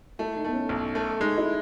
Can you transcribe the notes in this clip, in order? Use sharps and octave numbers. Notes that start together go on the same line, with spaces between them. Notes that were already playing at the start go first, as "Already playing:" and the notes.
A3 E4
D#4
A3 B3
C#4
B1
A3
G#3 D#4
E4